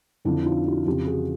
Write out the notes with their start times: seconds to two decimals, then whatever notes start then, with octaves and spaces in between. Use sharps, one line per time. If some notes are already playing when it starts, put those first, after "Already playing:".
0.25 F2 D3 F3 D4 E4
0.46 D#4 F4
0.66 E4 F#4
0.86 F2 C#3 E3 F4 G4
1.06 F#4 G#4